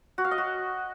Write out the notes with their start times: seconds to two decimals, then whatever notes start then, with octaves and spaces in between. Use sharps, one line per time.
0.18 F#4
0.25 F5
0.31 D#5
0.38 F#4